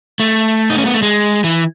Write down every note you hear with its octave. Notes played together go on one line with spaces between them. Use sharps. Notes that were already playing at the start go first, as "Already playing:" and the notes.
A3
D#4
C#4
B3
A3
G#3
E3